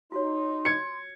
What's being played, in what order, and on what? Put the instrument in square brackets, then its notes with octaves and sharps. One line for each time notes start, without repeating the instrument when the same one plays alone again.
[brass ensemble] D#4 [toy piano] F4 F#4 C#5 [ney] C6
[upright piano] G#6 C#7